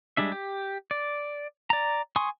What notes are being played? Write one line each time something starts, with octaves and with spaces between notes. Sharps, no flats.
G3 G#3 D4 E5
G4
D5
D5 A#5
G#5 C6 C#6 D#6